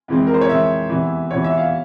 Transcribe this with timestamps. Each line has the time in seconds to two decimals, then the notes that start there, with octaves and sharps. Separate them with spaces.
0.08 F2 E3 G#3 C4
0.27 A#4
0.34 C5
0.41 C#5
0.49 F2 E3 G#3 C4 E5
0.89 E2 C3 E3
1.31 E2 C3 E3 C#5
1.44 E5
1.57 F5